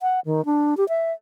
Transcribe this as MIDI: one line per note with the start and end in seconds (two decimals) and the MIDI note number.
0.01 0.20 78
0.25 0.45 51
0.45 0.77 62
0.77 0.87 67
0.89 1.12 76